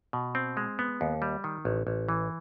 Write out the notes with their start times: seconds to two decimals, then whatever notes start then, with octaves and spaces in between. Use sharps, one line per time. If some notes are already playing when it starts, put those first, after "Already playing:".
0.13 B2
0.35 C4
0.57 G#3
0.79 B3
1.01 D#2
1.22 G3
1.44 D#3
1.65 A1
1.87 A1
2.09 E3